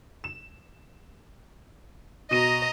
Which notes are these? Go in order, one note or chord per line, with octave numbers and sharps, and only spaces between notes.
E7
B2 D#5 A#5 D#7